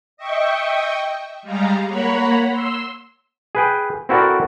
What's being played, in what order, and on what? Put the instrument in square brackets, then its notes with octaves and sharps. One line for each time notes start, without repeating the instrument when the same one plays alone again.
[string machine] D#5 E5 G5 C#6
G3 G#3 F5 A#5
A#3 C#5 F#5 A#5 B5
C6 E6
[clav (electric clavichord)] G#4 B4 G5
C4 E4 F#4 A4 A#4 D5